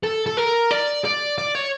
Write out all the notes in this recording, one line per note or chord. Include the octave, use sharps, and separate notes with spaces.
A4
A4
A#4
D5
D5
D5
C#5